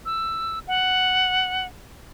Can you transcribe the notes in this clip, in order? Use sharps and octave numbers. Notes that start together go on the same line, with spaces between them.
E6
F#5